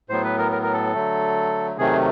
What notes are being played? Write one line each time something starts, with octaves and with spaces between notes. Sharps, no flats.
A2 F#3 B3 C5
B4
A#4
A#4
A#4
A4
D3 F#3 A3
C3 D#3 F#3 A3 G#4